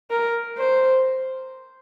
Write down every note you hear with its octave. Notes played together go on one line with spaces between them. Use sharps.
A#4
C5